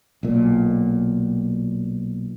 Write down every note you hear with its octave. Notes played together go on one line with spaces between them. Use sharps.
B1 A#2